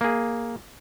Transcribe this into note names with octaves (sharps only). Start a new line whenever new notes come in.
A#3 G#4